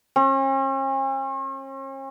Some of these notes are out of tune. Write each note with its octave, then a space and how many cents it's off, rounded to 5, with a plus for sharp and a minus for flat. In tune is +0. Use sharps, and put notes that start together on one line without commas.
C#4 -45